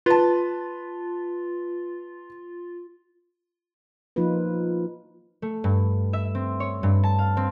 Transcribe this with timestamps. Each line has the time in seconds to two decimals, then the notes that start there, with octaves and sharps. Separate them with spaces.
0.06 F4 B4 A5
4.16 F3 A#3 D#4 F4 B4
5.42 A3
5.64 G2
6.13 E5
6.35 C4
6.60 C#5
6.83 G2
7.03 A5
7.19 F5
7.37 C4